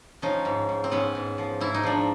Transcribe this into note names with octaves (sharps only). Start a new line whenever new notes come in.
F3 C#4 D#4
G#2
G#2
C4
G#2 B3 C#4
G#2
F3
G#2 E4
D#4
F3 D4